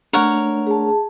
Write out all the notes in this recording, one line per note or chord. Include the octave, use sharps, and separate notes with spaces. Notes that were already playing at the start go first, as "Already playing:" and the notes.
A3 D4 A#4 C#5 F#5
G#4 A5